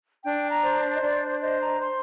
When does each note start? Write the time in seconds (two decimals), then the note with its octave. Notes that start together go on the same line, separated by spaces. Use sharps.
0.23 D4 G5
0.49 A#5
0.62 C5
0.93 D#5
1.01 D4 D5
1.40 C5 D#5
1.60 A#5
1.80 C5 C6